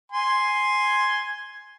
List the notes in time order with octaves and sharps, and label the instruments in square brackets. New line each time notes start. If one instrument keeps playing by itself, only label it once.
[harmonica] G#5 C6